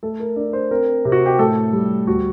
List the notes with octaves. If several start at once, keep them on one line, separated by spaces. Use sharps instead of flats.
A3 A4
A#4
D4 D5
C5
C4 A#4
C3
F#4
G4
A2 A4
G3
D2 F#4